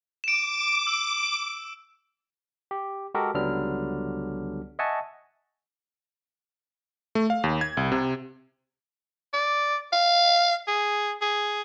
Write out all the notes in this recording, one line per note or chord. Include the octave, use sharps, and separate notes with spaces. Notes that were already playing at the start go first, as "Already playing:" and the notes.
D6 D7 E7
E6
G4
G#3 F#4 G4 A4 A#4
C#2 D3 F#3 G3 B3 F6
D#5 E5 F#5 G#5 A5 C#6
A3
F5
D#2
G#6
C2
C3
D5
F5
G#4
G#4